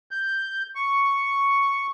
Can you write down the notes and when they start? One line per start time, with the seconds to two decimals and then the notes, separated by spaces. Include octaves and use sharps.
0.11 G6
0.76 C#6